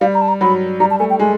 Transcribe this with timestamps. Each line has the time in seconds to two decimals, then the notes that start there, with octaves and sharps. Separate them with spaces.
0.01 G3 F5
0.14 A#5
0.22 A5
0.28 A#5
0.41 F#3 B5
0.80 G3 A#5
0.91 A5
0.99 A3 G#5
1.10 G5
1.20 G#3 G#5